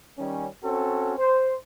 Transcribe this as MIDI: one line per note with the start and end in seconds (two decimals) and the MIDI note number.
0.18 0.46 51
0.18 0.46 55
0.18 0.46 61
0.63 1.14 60
0.63 1.14 61
0.63 1.14 66
0.63 1.14 69
1.18 1.54 72